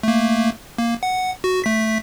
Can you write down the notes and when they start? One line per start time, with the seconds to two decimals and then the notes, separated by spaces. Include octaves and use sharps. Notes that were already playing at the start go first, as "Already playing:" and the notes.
0.03 A3 A#3
0.78 A#3
1.03 F#5
1.44 F#4
1.64 A3 B6